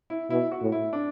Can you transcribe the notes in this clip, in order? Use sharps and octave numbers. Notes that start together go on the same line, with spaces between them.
E4
B2 E4
F#4
A2
E4
D4